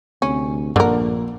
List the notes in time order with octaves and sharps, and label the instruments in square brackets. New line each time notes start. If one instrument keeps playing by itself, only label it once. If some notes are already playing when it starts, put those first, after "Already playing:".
[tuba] D2 [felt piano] C3 [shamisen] C#4
[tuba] A#1 [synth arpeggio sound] G2 [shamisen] D3 A#4 [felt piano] A#3